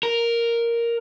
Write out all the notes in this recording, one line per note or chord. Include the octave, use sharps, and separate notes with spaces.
A#4